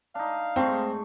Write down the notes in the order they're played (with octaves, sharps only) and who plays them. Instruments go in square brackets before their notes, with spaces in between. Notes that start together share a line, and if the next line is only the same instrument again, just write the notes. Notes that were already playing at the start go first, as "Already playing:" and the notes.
[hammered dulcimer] D4 D#4 [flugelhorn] F5
[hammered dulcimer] G#2 A3 C#6 [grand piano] C4